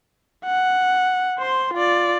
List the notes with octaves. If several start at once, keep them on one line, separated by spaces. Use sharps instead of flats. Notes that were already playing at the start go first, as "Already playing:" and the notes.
F#5
C5 C6
F4 D5